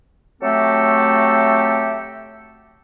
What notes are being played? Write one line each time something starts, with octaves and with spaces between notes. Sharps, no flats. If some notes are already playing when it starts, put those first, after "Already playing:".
F#3 A3 C4 G4 A4 E5